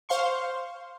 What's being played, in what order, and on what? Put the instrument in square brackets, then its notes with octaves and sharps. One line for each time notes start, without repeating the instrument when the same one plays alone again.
[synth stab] C5 F5 C6 C#6